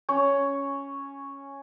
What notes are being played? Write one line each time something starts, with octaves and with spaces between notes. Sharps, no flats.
C#4 C#5